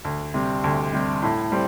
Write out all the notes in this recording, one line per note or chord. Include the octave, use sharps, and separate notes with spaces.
D2
C3 G3
D2
C3 G3
A2
G3 C4